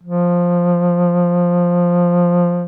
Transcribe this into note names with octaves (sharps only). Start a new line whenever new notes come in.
F3